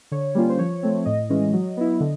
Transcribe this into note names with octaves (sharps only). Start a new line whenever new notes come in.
D3 C#5
G3 A#3 C#4 F4
C5
F3 C#5
A3 C4
A2 D#5
E3 G#3 C#4
F#3
B3 E4
D3